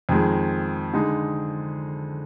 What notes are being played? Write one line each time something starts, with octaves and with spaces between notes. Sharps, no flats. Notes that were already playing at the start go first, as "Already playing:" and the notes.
F2 D#3 G#3
D3 G#3 D#4